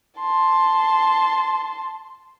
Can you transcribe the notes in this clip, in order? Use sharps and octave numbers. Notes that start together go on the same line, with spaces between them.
A5 C6